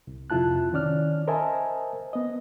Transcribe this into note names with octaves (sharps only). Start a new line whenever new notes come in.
C2
F2 C3 E4 F4 A5 F#6
D#3 C#4 D5 F6
A#4 C5 D#5 E5 G#5 A5
B3 D#5